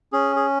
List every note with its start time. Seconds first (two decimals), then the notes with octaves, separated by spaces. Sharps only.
0.13 C#4 G#4
0.36 G#4